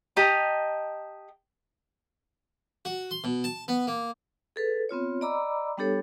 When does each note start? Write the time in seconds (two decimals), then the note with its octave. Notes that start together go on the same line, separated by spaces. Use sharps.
0.16 G4 D#5 A5 A#5
2.85 F#4
3.11 C6
3.24 B2
3.44 A5
3.68 B3
3.87 A#3
4.56 G#4 A4 B4
4.89 B3 C4 F4 C#5
5.21 D5 D#5 A#5 B5 D6 E6
5.77 G3 B3 D4 G4 A4 C#5